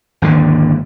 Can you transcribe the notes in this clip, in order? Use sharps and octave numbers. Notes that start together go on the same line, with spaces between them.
G#1 D#2 D3